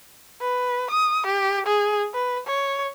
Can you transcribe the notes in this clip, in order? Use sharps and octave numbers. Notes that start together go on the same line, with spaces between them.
B4
D#6
G4
G#4
B4
C#5